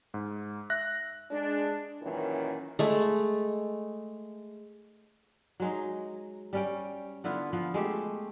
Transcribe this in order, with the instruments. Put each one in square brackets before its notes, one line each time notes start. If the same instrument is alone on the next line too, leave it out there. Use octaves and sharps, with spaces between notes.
[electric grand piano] G#2
E5 F#6 A#6
[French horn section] G#3 D4
F#2 A#2 D#3 E3 C#4
[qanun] G#3 A3
[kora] F#3 G#3 D#4
G3 C#4 G5
D3 B3 E4 F4
F3 B3
G#3 A3 G4